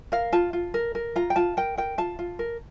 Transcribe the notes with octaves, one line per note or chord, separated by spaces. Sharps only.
A#4 F5
F4 A5
F4
A#4
A#4
F4 A#5
G5
F4 A5
A#4 G5
A#4 G5
F4 A5
F4
A#4